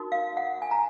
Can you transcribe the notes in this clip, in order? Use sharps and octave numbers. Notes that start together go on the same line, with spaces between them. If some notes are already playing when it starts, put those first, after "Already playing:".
Already playing: D#4 F#4 A#4
F5
F#5
G#5
A#5